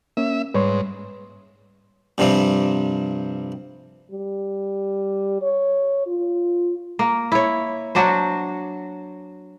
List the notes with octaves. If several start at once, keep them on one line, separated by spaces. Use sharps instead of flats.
A#3 C#4 E5
G#2 G3 B4 C#5 C6
G2 C3 F3 G3 C4
G3
C#5
F4
A#3
E4 C#5
F#3 D4 F#4 C5